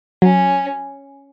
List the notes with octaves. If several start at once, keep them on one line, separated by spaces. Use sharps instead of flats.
F#3 C#4